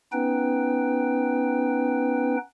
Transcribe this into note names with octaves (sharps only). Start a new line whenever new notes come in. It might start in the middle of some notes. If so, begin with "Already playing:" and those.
B3 C#4 D#4 B4 G5